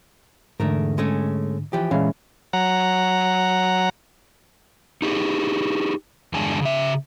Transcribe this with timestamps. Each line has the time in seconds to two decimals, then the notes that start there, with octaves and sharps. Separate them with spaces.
0.60 E2 G#2 D3 A3 A#4
0.98 G#3 A3 C#4
1.73 E3 F3 G4
1.91 A#2 E3 G#3 C#4 F5
2.53 F#3 F#5 A#5
5.02 D#4 G4 G#4
6.33 E2 G2 D3 G#3 G#5 A5
6.62 C#3 E5